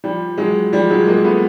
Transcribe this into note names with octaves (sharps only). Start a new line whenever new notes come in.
F3 G3
F#3 G#3
F3 G3
F#3 G#3
G#3 A#3
A3 B3